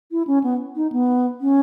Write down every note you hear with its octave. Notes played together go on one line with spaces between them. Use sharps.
E4
C#4
B3
D#4
B3
C#4